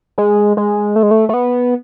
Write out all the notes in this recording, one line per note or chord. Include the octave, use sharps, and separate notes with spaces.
G#3
G#3
A3
G#3
A3
A3
B3